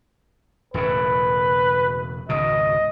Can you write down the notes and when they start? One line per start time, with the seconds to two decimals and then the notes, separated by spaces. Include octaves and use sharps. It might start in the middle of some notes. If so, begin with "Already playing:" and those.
0.74 E1 A2 C#3 B4
2.29 G#1 C#2 B2 D#5